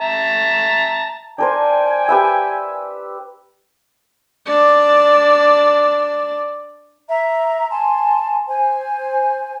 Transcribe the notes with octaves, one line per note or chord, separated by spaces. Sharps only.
E5 A5 A#5
D4 A#4 C5 G5 G#5
G4 B4 E5
D4 D5
E5 A#5
G#5 A5 C6
C5 G#5